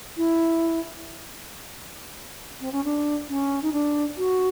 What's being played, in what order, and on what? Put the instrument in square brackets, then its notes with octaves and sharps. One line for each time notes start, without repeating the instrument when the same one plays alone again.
[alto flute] E4
C4
C#4
D4
C#4
D#4
D4
F#4